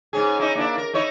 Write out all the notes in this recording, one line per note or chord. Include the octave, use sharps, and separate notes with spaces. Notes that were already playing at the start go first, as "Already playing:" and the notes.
G#2 C#4 G#4
C#4 D#4 E4
A#3 D4 E4
A#4
D#4 E4 C#5